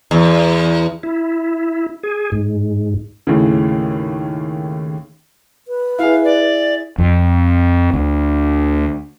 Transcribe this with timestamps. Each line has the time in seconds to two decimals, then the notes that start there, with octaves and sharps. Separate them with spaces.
0.11 E2
1.03 E4
2.03 G#4
2.32 G#2
3.27 D#2 A2 C#3
5.68 B4
5.99 E4 G#4 F5
6.24 D5
6.98 F2
7.93 D2